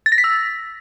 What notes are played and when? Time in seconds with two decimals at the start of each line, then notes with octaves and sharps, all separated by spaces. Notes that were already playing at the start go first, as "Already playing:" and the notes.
0.06 A6
0.12 A#6
0.18 B6
0.24 E6